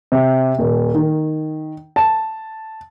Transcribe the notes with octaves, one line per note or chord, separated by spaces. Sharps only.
C3
D#1
D#3
A5